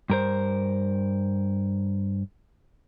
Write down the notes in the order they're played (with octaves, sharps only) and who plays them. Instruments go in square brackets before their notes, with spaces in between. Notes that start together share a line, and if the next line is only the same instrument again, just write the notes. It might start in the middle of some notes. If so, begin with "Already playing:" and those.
[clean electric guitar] G2 A#4 C5